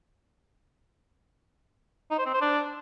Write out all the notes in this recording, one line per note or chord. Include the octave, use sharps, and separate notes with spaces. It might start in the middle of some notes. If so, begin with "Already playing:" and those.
D#4
C5
C4
C5
D4